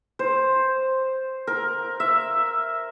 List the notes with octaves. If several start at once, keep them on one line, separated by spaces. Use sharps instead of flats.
C5
A#4
E5